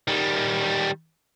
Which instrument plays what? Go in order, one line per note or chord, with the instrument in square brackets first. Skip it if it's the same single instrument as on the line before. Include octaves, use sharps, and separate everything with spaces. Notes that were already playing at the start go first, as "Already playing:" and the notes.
[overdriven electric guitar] D#3 G3